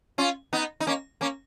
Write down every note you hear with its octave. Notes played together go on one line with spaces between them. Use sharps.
C#4 F4
B3 D#4
D#4
A#3 C#4
A#3 C#4